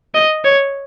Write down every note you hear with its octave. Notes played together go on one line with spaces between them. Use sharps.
D#5
C#5